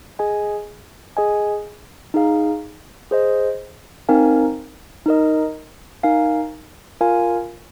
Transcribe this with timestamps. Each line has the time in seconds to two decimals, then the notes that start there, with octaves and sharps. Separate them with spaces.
0.19 G#4 D#5 G#5
1.17 G#4 D#5 G#5
2.14 D#4 G#4 F5
3.11 G#4 C5 D#5
4.09 C4 D#4 A#4 F5 G#5
5.06 D#4 A#4 D#5
6.03 D#4 A#4 F5 G#5
7.01 F4 A#4 F5 G#5